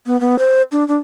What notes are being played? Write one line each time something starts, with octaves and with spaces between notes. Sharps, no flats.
B3
B3
C5
D4
D4